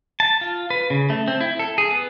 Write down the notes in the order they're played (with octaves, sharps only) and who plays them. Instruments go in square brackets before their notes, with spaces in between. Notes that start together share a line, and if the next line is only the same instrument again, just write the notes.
[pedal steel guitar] A5
F4
B4
C#3
A3
C4
E4
A4
G#4
B3